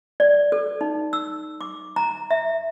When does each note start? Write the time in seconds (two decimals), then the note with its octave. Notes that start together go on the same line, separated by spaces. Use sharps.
0.20 D5
0.52 A4
0.81 D#4
1.13 E6
1.61 D6
1.96 A#5
2.31 E5